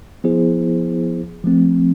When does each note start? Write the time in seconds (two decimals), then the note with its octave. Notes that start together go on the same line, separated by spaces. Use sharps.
0.24 F3 B3 E4 G#4 C5
1.44 F3 A3 C4